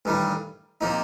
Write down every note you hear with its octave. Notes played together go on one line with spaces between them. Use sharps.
A1 G2 D#3 G3
C3 F3 A#3 D#4